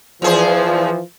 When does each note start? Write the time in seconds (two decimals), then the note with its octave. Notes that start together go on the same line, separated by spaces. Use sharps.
0.22 E2 E3 F3 G#4 C5